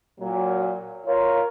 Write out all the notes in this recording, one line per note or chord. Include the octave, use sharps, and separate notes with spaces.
A#2 F#3
F4 A#4 C#5